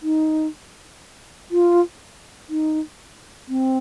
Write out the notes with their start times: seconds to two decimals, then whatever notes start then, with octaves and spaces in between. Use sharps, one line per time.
0.03 D#4
1.51 F4
2.50 D#4
3.48 C4